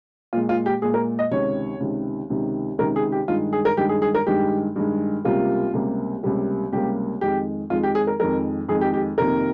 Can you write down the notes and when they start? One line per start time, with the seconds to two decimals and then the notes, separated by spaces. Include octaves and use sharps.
0.33 A#2 G#3 F4
0.49 F4
0.66 G4
0.82 A#2 G#3 G#4
0.94 A#4
1.19 D#5
1.31 C#2 C3 D#3 C#5
1.80 C#2 C3 D#3
2.30 C#2 C3 D#3
2.78 C#2 C3 D#3 A#4
2.96 G#4
3.12 G4
3.28 G2 D#3 G#3 F4
3.53 G#4
3.65 A#4
3.77 G2 D#3 G#3 G4
3.89 G#4
4.02 G#4
4.15 A#4
4.26 G2 D#3 G#3 G4
4.76 G2 D#3 G#3
5.24 C#2 C3 G3 A#3 F4
5.73 C#2 C3 G3 A#3
6.23 C#2 C3 G3 A#3
6.72 C#2 C3 G3 A#3 G4
7.21 F2 D#3 G#3 G4
7.70 F2 D#3 G#3 F4
7.83 G4
7.95 G#4
8.07 A#4
8.20 F2 D#3 G#3 A#4
8.68 F2 D#3 G#3 G#4
8.81 G4
8.94 G4
9.18 F2 C3 D#3 A#3 A#4